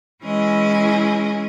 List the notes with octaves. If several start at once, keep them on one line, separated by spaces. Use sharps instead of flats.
E3 G#3 C#4 E4 G#4 D#5